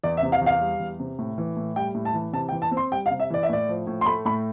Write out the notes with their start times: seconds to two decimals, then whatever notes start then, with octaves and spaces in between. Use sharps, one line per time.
0.04 E2 D5
0.17 E5
0.23 C3
0.32 F5
0.41 E2
0.46 F5
0.61 G3
0.80 E2
1.00 C3
1.19 A2
1.38 E3
1.57 A2
1.76 G3 G5
1.95 A2
2.05 A5
2.14 E3
2.33 C3 A5
2.49 G5
2.52 E3
2.62 A5
2.71 C4
2.77 C6
2.92 G3 G5
3.06 F5
3.11 C3
3.20 E5
3.30 E3 D5
3.43 E5
3.49 A2 D5
3.69 F3
3.87 A2
4.01 C6
4.06 A3 B5
4.25 A2 B5